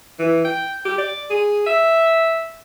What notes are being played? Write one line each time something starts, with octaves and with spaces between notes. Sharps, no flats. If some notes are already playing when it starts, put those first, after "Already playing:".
E3
G5
G4
D5
G#4
E5